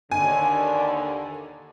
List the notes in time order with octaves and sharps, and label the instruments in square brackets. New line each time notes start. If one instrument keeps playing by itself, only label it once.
[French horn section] D#2 D3 [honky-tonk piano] G#5